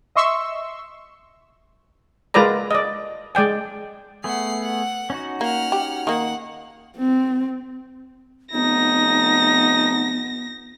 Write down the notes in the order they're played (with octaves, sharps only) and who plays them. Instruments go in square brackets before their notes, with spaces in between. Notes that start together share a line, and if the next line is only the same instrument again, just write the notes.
[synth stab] D#5 E5 C6 C#6 E6
[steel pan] G#3 F4 A#4 B4 D5 A#5
D5 D#5
G#3 D5 G5 G#5
[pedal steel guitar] A3 B3 G#4 [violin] F#5 C7
[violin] F#5
[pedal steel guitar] C#4 D#4 F#4
[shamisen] A#3 [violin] F#5 F6
[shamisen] G4
[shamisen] D#3 A#3 [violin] F#5
[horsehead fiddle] C4
[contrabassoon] F1 [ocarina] B3 [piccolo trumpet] D#4 [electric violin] A#6